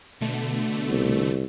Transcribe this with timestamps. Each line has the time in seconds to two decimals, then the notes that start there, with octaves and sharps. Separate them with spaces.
0.21 B2 D3 A3
0.88 C2